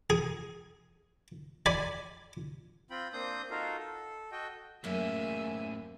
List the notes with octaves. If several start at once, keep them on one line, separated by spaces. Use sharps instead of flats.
G#4
D5 G#5 B5
C4 F4 G5 B5
A#3 C4 D4 C5 D#6 G6
D#4 F4 F#4 A4 A#4 F5
A4
F#4 A4 D#5 G5
F#2 A2 C#3 A#3 E5 G#5